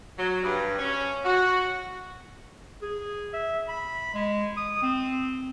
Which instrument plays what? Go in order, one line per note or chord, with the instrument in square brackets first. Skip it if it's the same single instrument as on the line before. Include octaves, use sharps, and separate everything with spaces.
[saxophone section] F#3
G2
C#4
F#4
[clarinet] G#4
E5
B5
G#3
D#6
C4